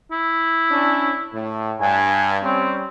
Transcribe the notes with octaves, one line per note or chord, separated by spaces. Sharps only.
E4
C#4 D4
A2
G2 G#5
G3 C4 C#4